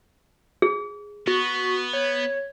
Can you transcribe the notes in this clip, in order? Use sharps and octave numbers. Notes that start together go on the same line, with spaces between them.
G#4
B3 F#4
C#5